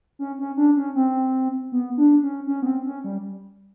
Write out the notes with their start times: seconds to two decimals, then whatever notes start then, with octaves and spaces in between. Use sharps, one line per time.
0.19 C#4
0.39 C#4
0.57 D4
0.77 C#4
0.95 C4
1.72 B3
1.97 D4
2.23 C#4
2.47 C#4
2.62 B3
2.66 C4
2.86 C#4
3.04 G3